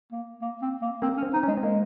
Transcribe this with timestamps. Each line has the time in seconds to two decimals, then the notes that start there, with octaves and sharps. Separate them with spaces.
0.12 A#3
0.42 A#3
0.62 C4
0.82 A#3
1.02 A#3 C4
1.17 C#4
1.23 C4
1.33 D#4
1.36 C4
1.43 C#4
1.48 G#3
1.57 C4
1.63 G#3 A#3